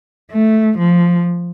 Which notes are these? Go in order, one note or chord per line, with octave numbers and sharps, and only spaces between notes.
A3
F3